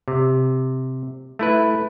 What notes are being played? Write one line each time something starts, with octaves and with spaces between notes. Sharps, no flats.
C3
A3 E4 B4